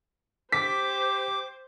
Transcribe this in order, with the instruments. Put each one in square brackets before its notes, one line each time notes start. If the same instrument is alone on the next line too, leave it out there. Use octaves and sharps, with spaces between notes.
[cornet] G4 [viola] C5 [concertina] D6 [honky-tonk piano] B6